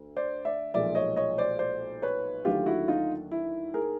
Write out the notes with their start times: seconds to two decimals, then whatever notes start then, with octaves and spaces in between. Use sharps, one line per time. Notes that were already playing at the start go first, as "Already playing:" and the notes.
Already playing: D2
0.16 C5 D5
0.45 D5 E5
0.74 B1 A#2 F3 G#3 D5 E5
0.95 C#5 D#5
1.16 C#5 D#5
1.38 C5 D5
1.59 C5 D5
2.02 B4 C#5
2.45 D#2 D3 F#3 A3 F4 G4
2.66 E4 F#4
2.88 D#4 F4
3.32 E4
3.74 G#4 A#4